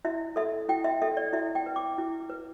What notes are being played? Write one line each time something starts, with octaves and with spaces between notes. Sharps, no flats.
E4 E5
A4 E5
E4 G5
E5
A4 E5
D5
E4 E5
G5
B4
D6
E4
B4